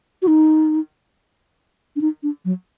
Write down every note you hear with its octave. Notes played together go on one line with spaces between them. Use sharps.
F#4
D#4
D4
D#4
D4
F#3